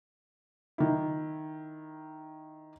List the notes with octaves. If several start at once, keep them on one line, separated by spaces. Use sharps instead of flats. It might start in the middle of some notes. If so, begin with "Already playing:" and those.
D#3 E4